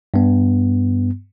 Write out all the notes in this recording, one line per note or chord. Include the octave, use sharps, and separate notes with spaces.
G2 B3